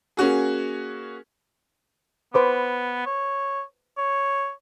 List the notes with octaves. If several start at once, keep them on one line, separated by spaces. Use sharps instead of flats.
A#3 C#4 F#4 G#4
B3 B4 C5 D6
C#5
C#5